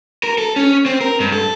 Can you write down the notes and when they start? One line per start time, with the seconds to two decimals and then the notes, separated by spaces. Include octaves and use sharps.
0.23 A#4
0.38 A4
0.56 C#4
0.86 C4
1.01 A#4
1.20 G2
1.32 A4